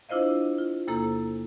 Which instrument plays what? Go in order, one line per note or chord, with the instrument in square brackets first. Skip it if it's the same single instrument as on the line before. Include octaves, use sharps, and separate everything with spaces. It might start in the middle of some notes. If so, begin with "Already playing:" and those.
[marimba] D4 E4 F4 C5 D#5 F5
F4
E2 C3 A#3 E4 A4 A#5